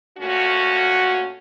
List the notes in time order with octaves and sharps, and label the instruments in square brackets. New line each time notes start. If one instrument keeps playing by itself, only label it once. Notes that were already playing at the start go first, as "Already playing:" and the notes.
[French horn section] A#2 A3 C#4 F#4